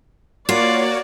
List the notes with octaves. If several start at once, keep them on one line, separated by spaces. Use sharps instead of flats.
A#3 F4 F#4 C#5 D5